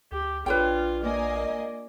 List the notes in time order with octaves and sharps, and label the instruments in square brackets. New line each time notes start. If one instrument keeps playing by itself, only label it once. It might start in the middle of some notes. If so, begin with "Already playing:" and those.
[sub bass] D2 [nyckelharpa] G4
[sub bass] A#1 [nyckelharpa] D4 F4 [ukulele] B4 C#5 G5
[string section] A#3 D#5 G#5 [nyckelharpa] D5